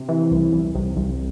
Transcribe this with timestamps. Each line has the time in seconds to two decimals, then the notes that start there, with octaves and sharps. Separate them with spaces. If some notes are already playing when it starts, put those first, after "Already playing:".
Already playing: C3
0.09 E3
0.31 C2
0.53 C2
0.75 C2
0.97 C2